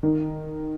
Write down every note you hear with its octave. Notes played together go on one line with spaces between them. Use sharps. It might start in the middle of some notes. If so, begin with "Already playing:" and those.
D#3